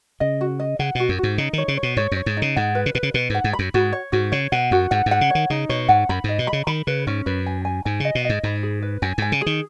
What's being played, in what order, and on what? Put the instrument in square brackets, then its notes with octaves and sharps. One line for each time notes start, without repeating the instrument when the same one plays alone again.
[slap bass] C#3 [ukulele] D#5
[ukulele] F#4
D#5
[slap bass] C#3 [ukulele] F#5
[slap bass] B2 [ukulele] F#4
[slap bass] F#2
[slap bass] G#2 [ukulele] F#4
[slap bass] C#3 [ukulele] D#4
[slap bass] D#3 [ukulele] C#5
[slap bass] C#3
[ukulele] C#5
[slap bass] B2
[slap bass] G#2 [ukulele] C#5
[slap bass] F#2
[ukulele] C#5
[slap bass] G#2
[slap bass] C#3 [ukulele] D#4
[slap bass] G#2 [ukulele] F#5
[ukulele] B4
[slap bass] C#3
[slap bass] B2 [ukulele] B4
[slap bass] C#3
[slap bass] B2 [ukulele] B4
[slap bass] G#2 [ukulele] F#5
[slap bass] G#2
[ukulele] B5
[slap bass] F#2
[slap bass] G#2 [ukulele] F#4
[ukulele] C#5
[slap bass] G#2 [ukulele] F#4
[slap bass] C#3 [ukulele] C#5
[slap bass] B2 [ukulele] F#5
[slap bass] F#2 [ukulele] F#4
[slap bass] G#2 [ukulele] F#5
[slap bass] G#2
[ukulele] F#5
[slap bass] C#3
[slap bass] D#3 [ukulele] C#5
[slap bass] C#3 [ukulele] D#4
[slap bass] B2 [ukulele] C#5
[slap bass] G#2 [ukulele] F#5
[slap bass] F#2 [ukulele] B5
[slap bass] G#2 [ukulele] D#5
[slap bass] B2
[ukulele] B5
[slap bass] C#3
[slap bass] D#3 [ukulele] B5
[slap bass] C#3 [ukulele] B4
[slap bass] G#2 [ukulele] C#4
[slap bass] F#2 [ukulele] B4
[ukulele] G#5
G#5
[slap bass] G#2 [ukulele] G#5
[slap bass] C#3 [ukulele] D#5
[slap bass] B2
[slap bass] G#2 [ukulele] D#5
[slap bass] G#2 [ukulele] B5
[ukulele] G#4
B4
[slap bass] F#2 [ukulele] G#5
[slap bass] G#2 [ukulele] G#5
[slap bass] C#3
[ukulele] G#4
[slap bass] D#3